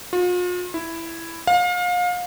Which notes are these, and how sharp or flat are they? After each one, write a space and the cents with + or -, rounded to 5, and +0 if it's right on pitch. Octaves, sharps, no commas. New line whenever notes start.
F4 +45
E4 +5
F5 +30